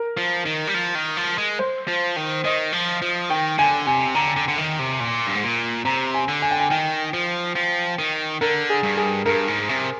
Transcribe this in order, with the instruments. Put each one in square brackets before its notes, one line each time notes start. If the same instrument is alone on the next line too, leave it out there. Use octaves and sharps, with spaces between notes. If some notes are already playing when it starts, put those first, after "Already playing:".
Already playing: [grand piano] A#4
[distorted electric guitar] F3
D#3
G3
F3
D#3
F3
G#3
[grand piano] C5
[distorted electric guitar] F3
D#3
[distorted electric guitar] D#3 [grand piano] D#5
[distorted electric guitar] F3
F3
[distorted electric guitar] D#3 [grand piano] G5
[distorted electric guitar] D3 [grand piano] G#5
[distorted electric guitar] C3 [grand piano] G#5
[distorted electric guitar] D3 [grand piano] A#5
[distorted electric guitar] D3
D3
D#3
C3
A#2
G2
G#2
A#2
[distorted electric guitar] C3 [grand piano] A#5
[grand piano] G#5
[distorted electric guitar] D3
[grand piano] G#5
G5
G#5
[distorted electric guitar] D#3 [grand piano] G5
[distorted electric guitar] F3
F3
D#3
[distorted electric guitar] D3 [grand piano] A#4
[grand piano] G#4
[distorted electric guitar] G2
[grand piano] G#4
[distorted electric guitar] G2 [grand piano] A#4
[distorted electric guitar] G#2
C3